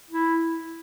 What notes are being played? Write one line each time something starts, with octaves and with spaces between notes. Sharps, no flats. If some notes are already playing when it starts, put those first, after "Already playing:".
E4